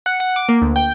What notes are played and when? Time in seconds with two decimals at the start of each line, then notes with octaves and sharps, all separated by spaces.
0.06 F#5
0.20 F#5
0.36 D6
0.49 A#3
0.62 D2
0.76 G5